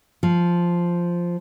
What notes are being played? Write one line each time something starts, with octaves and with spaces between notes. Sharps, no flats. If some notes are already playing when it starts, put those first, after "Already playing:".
F3